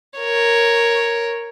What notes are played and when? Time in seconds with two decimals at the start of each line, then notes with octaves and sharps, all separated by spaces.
0.19 A#4 C#5